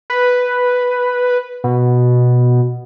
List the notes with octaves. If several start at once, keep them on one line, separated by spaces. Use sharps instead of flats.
B4
B2